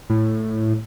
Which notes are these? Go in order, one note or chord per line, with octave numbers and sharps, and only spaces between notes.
A2